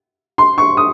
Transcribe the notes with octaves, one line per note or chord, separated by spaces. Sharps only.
C6
C#6
D#6